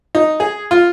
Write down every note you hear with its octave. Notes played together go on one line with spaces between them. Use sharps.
D#4
G#4
F4